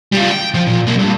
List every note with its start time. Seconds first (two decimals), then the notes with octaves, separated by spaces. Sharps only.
0.13 G3 F4
0.30 G5
0.54 F3
0.67 A#2
0.87 B1 A#3
0.99 G2